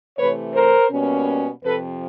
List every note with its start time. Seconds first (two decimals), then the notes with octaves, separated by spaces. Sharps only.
0.17 C3 E3 A3 B4 C#5
0.54 A#4 C5
0.91 B2 G3 A#3 C#4
1.63 F2 C3 F3 A4 B4